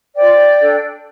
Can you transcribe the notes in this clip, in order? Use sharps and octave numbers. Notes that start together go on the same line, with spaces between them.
F4 C5 D5 G5
D4 A4